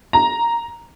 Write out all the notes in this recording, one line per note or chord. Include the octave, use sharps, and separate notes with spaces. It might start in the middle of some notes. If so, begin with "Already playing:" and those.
A#5